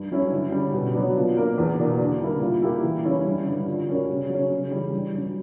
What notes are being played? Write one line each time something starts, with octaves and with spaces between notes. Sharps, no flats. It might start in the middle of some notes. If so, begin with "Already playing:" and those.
Already playing: G2
F#3 C#4 E4
D3
G3 C#4
B2
F#3 B3 D4
A#2
A#3 D4 A#4
E2
B2 A#3 D4
D3
G3 A#3 E4 A#4
A#2
A#3 E4 G4
E3
G3 C#4 E4
G2
D3 G3
A#2
G3 C#4 F#4 A#4
C#3
F#3 C#4
C#3
E3 G3
G2
F#3 C#4